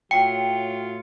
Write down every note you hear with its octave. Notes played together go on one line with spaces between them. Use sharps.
A2 F#3 F4 G5 C#7